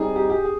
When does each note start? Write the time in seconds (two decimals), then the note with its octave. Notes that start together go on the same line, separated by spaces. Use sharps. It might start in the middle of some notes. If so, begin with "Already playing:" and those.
Already playing: G3 C4 D#4 G#4
0.16 G4
0.30 G4
0.44 G#4